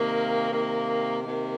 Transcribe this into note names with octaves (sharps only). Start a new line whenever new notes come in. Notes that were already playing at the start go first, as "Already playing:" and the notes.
Already playing: C3 D#3 A#3
C3 D#3 A#3
C3 D#3 A#3